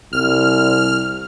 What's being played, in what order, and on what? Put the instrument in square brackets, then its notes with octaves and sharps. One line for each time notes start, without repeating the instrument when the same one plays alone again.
[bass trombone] C2 [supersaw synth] F6